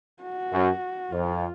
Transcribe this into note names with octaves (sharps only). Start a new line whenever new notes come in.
F#4
F#2
F2 F4